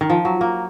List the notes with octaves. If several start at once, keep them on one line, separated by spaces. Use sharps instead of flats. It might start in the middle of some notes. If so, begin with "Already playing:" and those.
D#3
F3
F#3
A#3